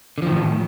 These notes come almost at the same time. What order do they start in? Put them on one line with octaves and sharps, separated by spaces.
D3 F3 D#3 A2